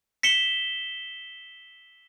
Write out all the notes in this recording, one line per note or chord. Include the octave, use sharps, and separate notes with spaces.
B6 C#7 E7 G7